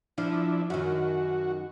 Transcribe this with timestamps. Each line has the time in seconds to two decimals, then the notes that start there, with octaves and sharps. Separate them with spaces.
0.18 F3 D4 E4
0.70 F#2 D#3 F#4